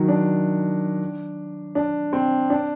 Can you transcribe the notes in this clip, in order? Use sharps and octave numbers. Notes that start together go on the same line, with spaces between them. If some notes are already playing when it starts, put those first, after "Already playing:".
Already playing: D#3 F#3
D4
D4
C4
D4